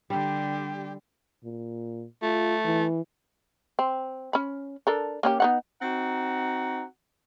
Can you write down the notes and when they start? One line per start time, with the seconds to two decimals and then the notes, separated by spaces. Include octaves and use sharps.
0.10 D3 G3 G4
1.44 A#2
2.22 A3 F4
2.65 E3
3.79 C4
4.33 C#4 B5
4.87 D4 A4 A#4
5.23 A#3 C#4 G4
5.40 B3 D#4 F#5
5.82 C4 D#4 F#4 F#5 A#5